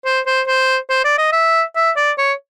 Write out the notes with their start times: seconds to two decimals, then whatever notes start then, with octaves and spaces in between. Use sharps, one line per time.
0.05 C5
0.26 C5
0.47 C5
0.90 C5
1.04 D5
1.18 D#5
1.32 E5
1.76 E5
1.97 D5
2.18 C#5